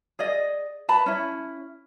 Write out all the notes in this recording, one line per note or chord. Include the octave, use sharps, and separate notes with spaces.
G#4 D5 D#5
B4 A5 B5
C#4 E4